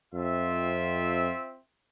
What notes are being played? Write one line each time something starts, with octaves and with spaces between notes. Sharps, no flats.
F2 C4 F4 E5